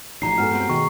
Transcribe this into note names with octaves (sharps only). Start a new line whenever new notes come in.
A1 F3 D#4 F#4 G#4 A#5 C7
G2 G#3 B3 F#4 A4 G#5 F6
C4 F#4 G4
B2 D#3 B3 F#4 G#4 D#5 G5 C#6